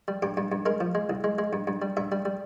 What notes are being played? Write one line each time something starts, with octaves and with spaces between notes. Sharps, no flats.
G3
G2 G4
G2
G2
G#3 A#4
F3
G#3
C2
G#3
G#3
G2
G2
G3
G2 E5
G3
G3